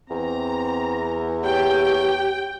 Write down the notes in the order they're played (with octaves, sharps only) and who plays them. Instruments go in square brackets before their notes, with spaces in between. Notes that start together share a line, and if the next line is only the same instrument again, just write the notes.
[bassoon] E2 [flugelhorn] C4 [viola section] A#5
[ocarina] G4 [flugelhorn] C#5 [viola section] G5